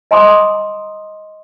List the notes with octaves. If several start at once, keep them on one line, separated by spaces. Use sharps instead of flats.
D#5 G#5 A#5 C6 D6 D#6